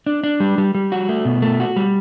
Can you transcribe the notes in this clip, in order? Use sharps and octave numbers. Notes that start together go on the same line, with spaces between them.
D4
D4
G3
G3
G3
F#4
A3
B2
A3
F#4
G3